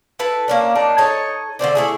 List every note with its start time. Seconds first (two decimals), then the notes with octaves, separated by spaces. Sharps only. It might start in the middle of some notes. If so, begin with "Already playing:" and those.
0.19 E4 A4 B4
0.48 A#3 C#4 D4
0.75 A#3 D4 D#4
0.98 D#4 A4 C#5 D#5
1.59 D3 A3 C4 D4
1.75 A3 E4 G#4